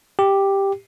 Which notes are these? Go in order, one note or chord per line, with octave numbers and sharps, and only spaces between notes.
G4